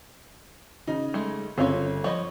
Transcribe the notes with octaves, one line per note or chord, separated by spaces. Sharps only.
C#3 D#4
G#3 A3
G1 C#3 C4 C#4 F4 C#5
F3 C#5 D#5 B5